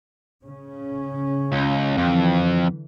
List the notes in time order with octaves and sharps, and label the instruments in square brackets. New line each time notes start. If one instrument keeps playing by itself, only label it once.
[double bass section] C#3 C#4
[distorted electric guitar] C#2
[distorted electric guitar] F2 [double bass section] D3 E3